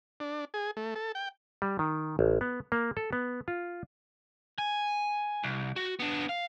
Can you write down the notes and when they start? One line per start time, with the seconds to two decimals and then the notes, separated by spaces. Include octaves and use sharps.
0.20 D4
0.54 G#4
0.77 A3
0.95 A4
1.15 G5
1.62 G3
1.79 D#3
2.19 A1
2.41 B3
2.72 A#3
2.97 A4
3.13 B3
3.48 F4
4.58 G#5
5.44 C2
5.76 F#4
6.00 B3 D4
6.29 F5